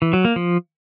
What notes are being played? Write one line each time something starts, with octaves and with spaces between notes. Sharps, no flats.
E3
F#3
A#3
F3